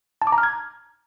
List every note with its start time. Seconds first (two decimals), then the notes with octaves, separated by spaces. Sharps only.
0.22 A5
0.27 D6
0.32 A#5
0.38 F6
0.43 G#6